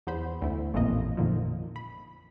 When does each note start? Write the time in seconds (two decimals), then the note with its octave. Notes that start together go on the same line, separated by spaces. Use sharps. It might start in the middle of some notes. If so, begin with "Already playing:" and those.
0.07 E2 B3 C5 B5
0.41 D2 E4
0.74 A1 F2 A#2 E3 A#3 D#5
1.17 F2 A#2 D3 D#3 F3
1.76 B5